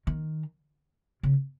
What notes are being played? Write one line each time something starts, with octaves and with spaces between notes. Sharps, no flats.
D#3
C#3